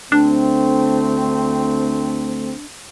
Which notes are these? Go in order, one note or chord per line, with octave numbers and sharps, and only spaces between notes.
D2 A3 C4 D4